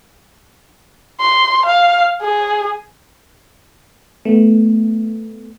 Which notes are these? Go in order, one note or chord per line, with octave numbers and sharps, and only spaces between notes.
C6
F5
G#4
A3 B3